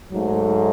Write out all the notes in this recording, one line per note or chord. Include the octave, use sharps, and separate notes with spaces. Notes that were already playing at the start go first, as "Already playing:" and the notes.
G#2 F#3 A3